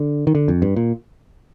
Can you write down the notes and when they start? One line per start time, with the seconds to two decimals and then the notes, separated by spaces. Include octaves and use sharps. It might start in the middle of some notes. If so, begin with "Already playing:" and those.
Already playing: D3
0.27 D#3
0.35 D3
0.48 F2
0.62 G2
0.76 A#2